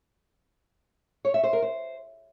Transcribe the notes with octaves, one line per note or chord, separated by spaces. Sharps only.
C#5
E5
C5
A#4
C5